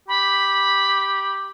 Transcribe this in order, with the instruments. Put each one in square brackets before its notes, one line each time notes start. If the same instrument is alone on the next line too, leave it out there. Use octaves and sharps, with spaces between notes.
[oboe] G4 [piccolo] B5